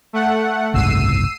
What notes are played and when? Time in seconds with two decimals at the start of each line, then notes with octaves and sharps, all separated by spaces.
0.13 A3 F#5
0.74 F#1 C2 G#2 E6 C7 D#7